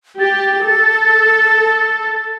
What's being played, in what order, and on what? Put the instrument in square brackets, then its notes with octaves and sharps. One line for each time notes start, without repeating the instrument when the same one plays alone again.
[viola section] G4 [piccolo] A6
[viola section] A4